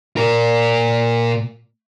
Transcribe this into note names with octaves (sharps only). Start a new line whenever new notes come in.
A#2 A#4